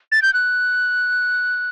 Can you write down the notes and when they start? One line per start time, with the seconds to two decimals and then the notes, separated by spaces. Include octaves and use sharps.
0.12 A6
0.22 G6
0.33 F#6